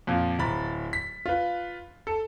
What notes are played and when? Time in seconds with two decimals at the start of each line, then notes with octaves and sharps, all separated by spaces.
0.07 F2 A#2
0.39 D1 A#5 B5 A6
0.93 B6
1.26 F4 B4
2.07 A4